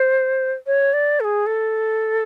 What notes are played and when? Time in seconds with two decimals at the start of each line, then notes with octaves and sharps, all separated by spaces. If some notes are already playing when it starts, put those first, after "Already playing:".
Already playing: C5
0.67 C#5
0.93 D5
1.20 A4
1.24 G#4
1.46 A4